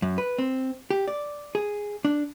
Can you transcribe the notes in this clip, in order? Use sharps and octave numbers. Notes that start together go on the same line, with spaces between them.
F#2
B4
C4
G4
D5
G#4
D4